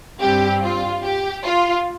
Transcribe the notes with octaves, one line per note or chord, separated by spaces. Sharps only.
G2 G3 C4 G4
F4
G4
F4